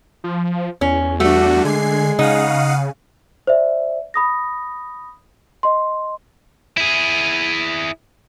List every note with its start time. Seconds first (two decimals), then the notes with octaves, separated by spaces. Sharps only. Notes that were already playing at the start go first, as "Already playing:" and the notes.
0.24 F3
0.81 E2 C#4
1.20 G3 A3 D4 F#4
1.65 D3 G#3 G#5 C7
2.19 C#3 D#4 F5 F#5 D#6
3.47 C5 D5 E5
4.14 B5 D#6 A#6
5.63 D#5 C6
6.77 E4 G#4